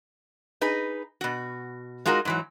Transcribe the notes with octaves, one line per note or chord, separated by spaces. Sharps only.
D#4 G#4 B4
B2 F#4
G#3 D#4 F4 F#4 A#4
G#2 E3 F#3